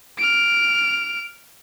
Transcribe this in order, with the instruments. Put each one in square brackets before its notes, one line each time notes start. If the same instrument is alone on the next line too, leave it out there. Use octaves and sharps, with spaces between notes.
[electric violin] F6 D7